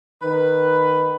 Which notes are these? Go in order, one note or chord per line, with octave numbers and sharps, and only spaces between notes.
D#3 B4